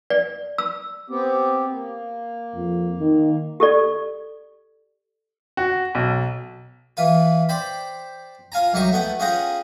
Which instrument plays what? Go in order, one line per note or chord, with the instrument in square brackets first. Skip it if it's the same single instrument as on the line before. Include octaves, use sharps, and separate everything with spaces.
[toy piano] D5
E6
[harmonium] B3 C4 G4
A#3
[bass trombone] F2
D#3
[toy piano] G4 A4 D5
[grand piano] F#4
B1
[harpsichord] E3 F4 B4
C5 D5 G5 B5
F4 F5 G#5 A#5
C2 F#3 D#4 G4 D#5 C#6
A3 B3 F#5 G5
C#4 F4 G#4 F#5 G5 A#5